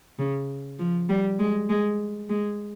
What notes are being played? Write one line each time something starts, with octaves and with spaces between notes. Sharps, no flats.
C#3
F3
G3
G#3
G#3
G#3